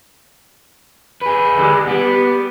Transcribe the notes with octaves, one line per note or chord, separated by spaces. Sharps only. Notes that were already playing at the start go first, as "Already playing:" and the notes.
G#4 B4
D3 G#3 G4
G3 B3 G4